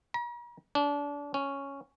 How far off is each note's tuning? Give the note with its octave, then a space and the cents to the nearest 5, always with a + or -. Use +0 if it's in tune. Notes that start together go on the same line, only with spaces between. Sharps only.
A#5 +45
D4 -30
C#4 +0